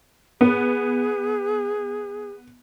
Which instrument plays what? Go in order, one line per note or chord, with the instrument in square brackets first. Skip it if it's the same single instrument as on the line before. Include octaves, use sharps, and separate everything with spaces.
[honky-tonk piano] B3 [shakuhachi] G#4